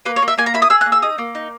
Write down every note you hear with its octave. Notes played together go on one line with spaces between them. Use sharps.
A#3 B4
C#5
A#3
E5
A#3 G#5
A#5
E4 B5
D#6
G#4 E6
F#6
A#3
E6
D#4 D#6
A#3
D#4